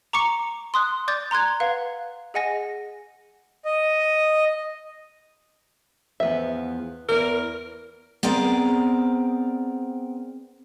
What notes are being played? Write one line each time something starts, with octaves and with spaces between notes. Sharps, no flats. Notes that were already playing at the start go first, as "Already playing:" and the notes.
A#5 C#6 D6 C#7
C6 D#6 F#6
D5 D6 G6 A6
A#5 C6 F#6 G#6
B4 F5 F#5
G#4 D#5 F#5 G#5 A#6
D#5
E2 F3 B3 E5
E2 E3 A#4
B3 C4 G#4 A#4 D5